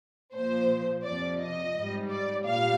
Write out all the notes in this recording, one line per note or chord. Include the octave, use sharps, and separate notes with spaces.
A#2 F3 C5
F2 C3 F3 D5
D#5
G#2 G3
D5
A#2 G3 F5